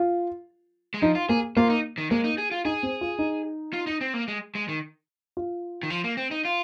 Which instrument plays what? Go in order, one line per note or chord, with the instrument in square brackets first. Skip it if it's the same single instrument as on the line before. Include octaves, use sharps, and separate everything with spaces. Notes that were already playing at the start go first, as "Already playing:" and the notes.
Already playing: [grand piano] F4
[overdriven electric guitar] G#3
[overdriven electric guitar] F3 [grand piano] D#4
[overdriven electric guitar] F4
[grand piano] A#3 [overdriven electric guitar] G#4
[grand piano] A#3 [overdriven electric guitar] F4
[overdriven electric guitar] D#4
D#3
[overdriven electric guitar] G#3 [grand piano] A#3
[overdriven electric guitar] D#4
G#4
F4
[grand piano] D#4 [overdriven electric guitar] G#4
[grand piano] C4
F4
D#4
[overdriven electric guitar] F4
D#4
C4
A#3
G#3
G#3
D#3
[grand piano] F4
[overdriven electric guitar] D#3
F3
A#3
C4
D#4
F4